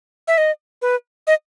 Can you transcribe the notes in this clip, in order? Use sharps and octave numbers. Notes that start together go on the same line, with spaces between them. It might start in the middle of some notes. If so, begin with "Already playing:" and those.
E5
D#5
B4
D#5